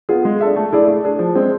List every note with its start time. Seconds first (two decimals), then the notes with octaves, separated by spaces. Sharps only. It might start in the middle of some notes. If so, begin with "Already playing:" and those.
0.09 B3 F4 G#4
0.25 G#3
0.41 D4 A4 E5
0.56 A3
0.72 E4 G#4 D5
0.88 A3
1.04 D4 G#4
1.19 F3
1.35 G#3 C4